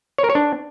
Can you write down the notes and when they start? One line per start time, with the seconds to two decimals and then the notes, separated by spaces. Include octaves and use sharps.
0.18 C#5
0.24 A#4
0.30 C#5
0.35 D4